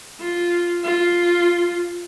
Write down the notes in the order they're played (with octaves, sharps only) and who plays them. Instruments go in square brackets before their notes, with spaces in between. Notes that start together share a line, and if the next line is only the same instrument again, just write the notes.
[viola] F4
F4